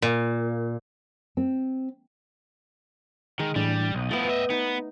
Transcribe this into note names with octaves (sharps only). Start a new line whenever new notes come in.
A#2
C4
D#3 G#3
A2 E3 G3 D4 A4
B1 G5 D#6
F3 A3 B3 E4
D#5 E5
B3 D#4